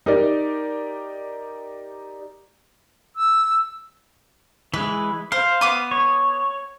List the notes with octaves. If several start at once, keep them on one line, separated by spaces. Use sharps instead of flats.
D#4 G4 A#4 D5
E6
E3 G#3 B4
C5 F5
B3 D6 D#6
C#5